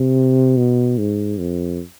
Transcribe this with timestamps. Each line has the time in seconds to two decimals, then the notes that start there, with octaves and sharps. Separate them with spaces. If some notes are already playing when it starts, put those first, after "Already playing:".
Already playing: C3
0.57 B2
0.98 G#2
1.38 F2